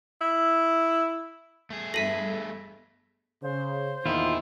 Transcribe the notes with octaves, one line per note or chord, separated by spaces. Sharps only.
E4
A3 G#4
G1 G2 A4 E5 A#6 B6 D#7 F#7
C#3 C5
E2 A#2 D#3 E4 F4